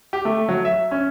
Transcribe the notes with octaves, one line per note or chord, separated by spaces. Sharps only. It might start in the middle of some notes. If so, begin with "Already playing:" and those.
G4
A3
F#3
E5
C#4